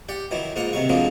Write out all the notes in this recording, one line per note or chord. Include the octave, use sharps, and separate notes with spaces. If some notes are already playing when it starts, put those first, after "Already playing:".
G4 D5 F#5
D#3 E3 F#3 E4
G#2 A#3 F4 F#5
C3 D#3 F#3 C#6
D3 F3 F#3 G#3 A#3 C4